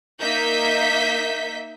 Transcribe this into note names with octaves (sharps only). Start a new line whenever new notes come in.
A#3 D#4 E5 G6 B6